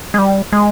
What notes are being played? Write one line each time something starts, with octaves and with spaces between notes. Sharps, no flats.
G#3
G3
G#3